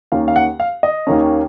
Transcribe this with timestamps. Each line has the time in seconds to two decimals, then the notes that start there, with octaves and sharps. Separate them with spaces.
0.12 D#2 D#3 A#3 C#4 F5
0.28 F5
0.36 F#5
0.60 F5
0.83 D#5
1.07 D#2 D#3 A#3 C#4